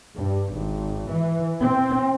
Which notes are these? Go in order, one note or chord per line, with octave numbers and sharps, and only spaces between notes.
G2
G#1
E3
C4